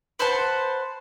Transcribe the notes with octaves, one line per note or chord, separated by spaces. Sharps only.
B4 C5 F#5 A5